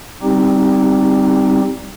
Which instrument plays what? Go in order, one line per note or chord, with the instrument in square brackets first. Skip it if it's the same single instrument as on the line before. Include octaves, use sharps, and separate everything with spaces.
[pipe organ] G3 C4 D#4 G4